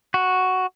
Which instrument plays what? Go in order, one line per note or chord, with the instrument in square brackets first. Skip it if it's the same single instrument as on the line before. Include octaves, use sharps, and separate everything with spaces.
[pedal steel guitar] F#4